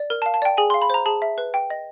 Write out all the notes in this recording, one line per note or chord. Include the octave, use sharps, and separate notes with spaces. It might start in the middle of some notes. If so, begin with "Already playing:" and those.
Already playing: D5
A#4
A5
F5
A5
D5 G5
G#4 G#5
C6
F5
B5
C5 A#5
G#4 A5
E5
B4
G5
D#5